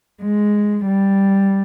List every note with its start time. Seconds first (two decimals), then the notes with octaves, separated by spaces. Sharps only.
0.21 G#3
0.86 G3